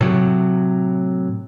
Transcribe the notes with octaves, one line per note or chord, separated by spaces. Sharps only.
A2 C3 F#3